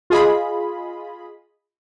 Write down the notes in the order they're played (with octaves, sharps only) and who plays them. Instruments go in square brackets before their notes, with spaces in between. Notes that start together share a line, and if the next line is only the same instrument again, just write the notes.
[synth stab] F4 G#4 D#5 B5